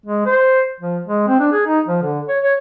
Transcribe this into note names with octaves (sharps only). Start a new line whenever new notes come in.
G#3
C5
F3
G#3
C4
D4
G#4
D#4
F3
D3
C#5
C#5